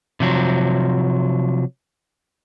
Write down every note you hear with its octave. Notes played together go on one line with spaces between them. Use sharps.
C3 F3 F#3